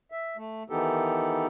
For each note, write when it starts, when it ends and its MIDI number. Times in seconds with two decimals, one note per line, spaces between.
0.12 0.37 76
0.37 0.63 57
0.70 1.47 51
0.70 1.47 52
0.70 1.47 59
0.70 1.47 63
0.70 1.47 67
0.70 1.47 69